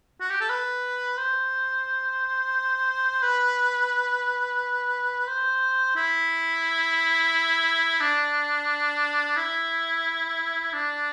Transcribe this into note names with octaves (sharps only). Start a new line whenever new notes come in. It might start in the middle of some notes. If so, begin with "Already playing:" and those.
F#4
G4
A4
B4
C5
B4
C5
E4
D4
E4
D4